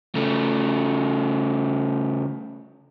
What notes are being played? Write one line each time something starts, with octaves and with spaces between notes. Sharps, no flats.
C#3 A3